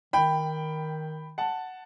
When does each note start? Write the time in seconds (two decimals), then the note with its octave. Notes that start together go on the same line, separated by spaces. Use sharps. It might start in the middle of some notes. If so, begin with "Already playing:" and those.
0.13 D#3 G5 B5
1.38 F#5 A5